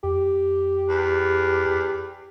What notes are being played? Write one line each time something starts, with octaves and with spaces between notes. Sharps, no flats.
F2 G4
E2